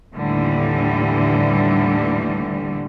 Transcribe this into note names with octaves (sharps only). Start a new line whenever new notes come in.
D#2 A2 D3 E3 G3